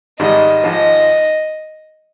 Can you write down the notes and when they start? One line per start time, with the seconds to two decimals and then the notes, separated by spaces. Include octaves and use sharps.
0.20 G#1 G#2 D#3 G3 D#5
0.64 G#1 G#2 F3 D#5